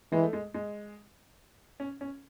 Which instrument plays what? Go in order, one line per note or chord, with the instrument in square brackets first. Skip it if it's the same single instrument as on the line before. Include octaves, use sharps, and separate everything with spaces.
[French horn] E3 [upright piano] G#3
[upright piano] A3
G#3
G#3
C#4
C#4